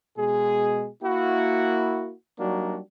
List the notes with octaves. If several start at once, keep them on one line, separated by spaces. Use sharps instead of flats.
B2 G#3 G#4
A#3 E4 F#4
F#3 G3 A#3 D4 D#4 F#4